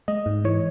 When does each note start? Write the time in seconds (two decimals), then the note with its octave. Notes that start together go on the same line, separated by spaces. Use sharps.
0.08 G#3 D#5
0.26 G#2
0.44 E3 C#5